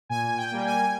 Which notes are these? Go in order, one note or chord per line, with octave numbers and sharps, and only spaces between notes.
A#2 G#5
G5
G3 A#3
G#5